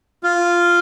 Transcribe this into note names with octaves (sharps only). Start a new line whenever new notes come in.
F4